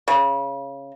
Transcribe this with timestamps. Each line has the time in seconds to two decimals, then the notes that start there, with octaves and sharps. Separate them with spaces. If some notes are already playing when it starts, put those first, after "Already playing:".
0.08 C#3